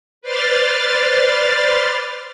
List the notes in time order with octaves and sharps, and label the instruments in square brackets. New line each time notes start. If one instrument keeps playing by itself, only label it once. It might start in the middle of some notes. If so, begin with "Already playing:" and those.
[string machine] B4 C5 D5 C6 F6 A6